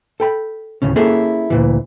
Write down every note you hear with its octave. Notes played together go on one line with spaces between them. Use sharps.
A4 G5 B5
D2 A2 C#3 C#4
A#3 C#4 E4 G#4 A4
D2 A#2 E3